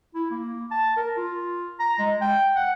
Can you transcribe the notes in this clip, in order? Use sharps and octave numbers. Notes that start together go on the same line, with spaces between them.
E4
A#3
A5
A#4
F4
A#5
G#3
G5
F#5